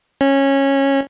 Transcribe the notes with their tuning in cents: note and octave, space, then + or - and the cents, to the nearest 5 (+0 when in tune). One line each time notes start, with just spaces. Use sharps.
C#4 -15